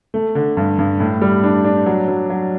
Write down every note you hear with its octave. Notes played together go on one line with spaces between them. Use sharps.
A3
D3
G2
G2
A2
G3
D4
D4
F#3
F#3
F#3